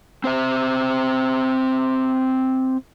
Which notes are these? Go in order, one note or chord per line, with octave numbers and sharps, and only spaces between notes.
C4 C5 E5